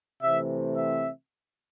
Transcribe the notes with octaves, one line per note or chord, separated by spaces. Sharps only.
C3 E3 A3 C4 E5
E5